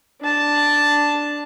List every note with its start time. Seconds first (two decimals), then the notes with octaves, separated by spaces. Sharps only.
0.21 D4 A5